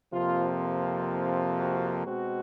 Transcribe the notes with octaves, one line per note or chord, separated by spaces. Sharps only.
F2 C3 F3 A#3 F4
F#4
B2 G#3 C4 F#4